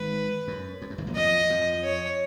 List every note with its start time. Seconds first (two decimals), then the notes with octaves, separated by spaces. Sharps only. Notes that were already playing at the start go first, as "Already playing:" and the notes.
Already playing: G#1 G#2 B4
0.48 F#2
0.82 F2
0.90 F#2
0.98 G#1 G#2
1.07 A#1 A#2
1.16 F2 F3 D#5
1.50 F2 F3
1.84 C#5